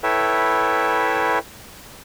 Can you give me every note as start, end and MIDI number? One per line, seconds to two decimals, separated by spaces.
0.03 1.39 64
0.03 1.39 69
0.03 1.39 71
0.03 1.39 73
0.03 1.39 76
0.03 1.39 79